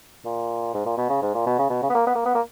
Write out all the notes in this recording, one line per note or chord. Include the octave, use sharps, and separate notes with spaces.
A#2
G#2
A#2
B2
C#3
G#2
A#2
B2
C#3
B2
C#3
B3
A#3
B3
A#3
B3
A#3